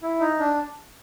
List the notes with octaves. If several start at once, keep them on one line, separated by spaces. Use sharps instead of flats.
E4
D#4
D4